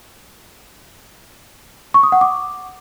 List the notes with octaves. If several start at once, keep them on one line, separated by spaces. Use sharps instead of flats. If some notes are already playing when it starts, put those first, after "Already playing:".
C#6
D#6
F#5
D6